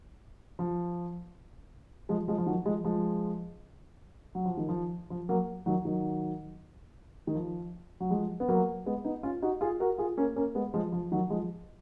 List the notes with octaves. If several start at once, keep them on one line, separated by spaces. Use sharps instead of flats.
F3
F3 G#3
F3 G#3
F3
D#3 F#3
F3 G#3
F3 G#3
F#3
F3
D#3
F3
F3
F#3 A#3
D#3 F#3
D#3 F#3
D#3
F3
F#3
F3 G#3
B3
F#3 A#3
G#3 B3
B3 D#4
C#4 F4
D#4 F#4
F4 G#4
F#4 A#4
F4 G#4
A#3 C#4
A#3 C#4
G#3 B3
F3 G#3
F3
D#3 F#3
F3 G#3